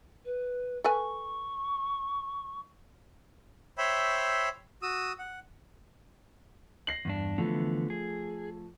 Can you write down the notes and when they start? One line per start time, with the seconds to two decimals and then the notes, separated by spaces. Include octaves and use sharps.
0.24 B4
0.84 A4 B4 G#5 C#6
3.78 C5 C#5 E5 G5 B5 E6
4.82 F#4 D#6 E6
5.19 F#5
6.87 A#6 C7 F#7
7.05 E2 G2 D4
7.38 D3 E3 F3 A3 B3
7.90 G#4